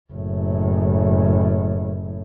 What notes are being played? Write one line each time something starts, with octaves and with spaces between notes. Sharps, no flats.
F#1 A2